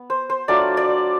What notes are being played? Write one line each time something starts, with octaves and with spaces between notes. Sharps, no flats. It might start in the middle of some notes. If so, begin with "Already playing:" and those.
Already playing: B3
C5
C5
F#3 A3 D4 F4 D5
D5